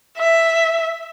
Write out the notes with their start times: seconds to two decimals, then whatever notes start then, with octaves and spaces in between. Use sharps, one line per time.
0.18 E5